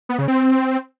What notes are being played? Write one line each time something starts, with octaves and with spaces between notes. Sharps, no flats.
B3
C#3
C4